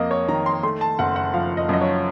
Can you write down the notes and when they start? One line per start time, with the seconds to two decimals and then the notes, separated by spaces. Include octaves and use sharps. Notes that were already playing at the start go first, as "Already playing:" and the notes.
Already playing: F2 A#3 D#5
0.11 C#5
0.29 D#3 A#5
0.46 C6
0.63 A3 C6
0.81 A5
0.99 F#1 F#5
1.16 F#5
1.34 F3 F5
1.57 D#5
1.69 F#2 D#5
1.81 C#5